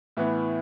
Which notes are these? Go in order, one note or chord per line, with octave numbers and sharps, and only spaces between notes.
A2 E3 B3